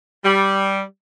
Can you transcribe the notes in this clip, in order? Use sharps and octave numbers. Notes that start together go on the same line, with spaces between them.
G3